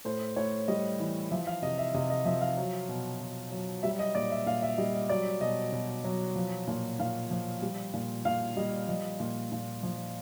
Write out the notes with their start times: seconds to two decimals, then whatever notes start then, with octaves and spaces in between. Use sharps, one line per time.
0.05 A2 C5
0.36 A2 C#5
0.68 G3 D#5
1.00 E3
1.31 F3 E5
1.47 F5
1.62 C3 D#5
1.78 E5
1.94 C3 D#5
2.10 D#5
2.25 F3 E5
2.41 F5
2.58 F#3
2.89 B2
3.21 B2
3.52 F#3
3.83 G3 E5
3.99 D#5
4.15 A#2 D5
4.31 E5
4.46 A#2 F5
4.62 E5
4.78 G3 D#5
4.94 D#5
5.09 F#3 D5
5.41 B2 D#5
5.72 B2
6.04 F#3
6.36 F3
6.67 A#2
6.99 A#2 F5
7.31 F3
7.62 G3
7.93 A#2
8.25 A#2 F5
8.57 G3 D#5
8.89 F3 D#5
9.20 A#2
9.52 A#2
9.83 F3